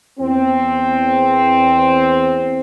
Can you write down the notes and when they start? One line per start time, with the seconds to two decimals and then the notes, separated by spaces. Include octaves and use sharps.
0.19 E2 C4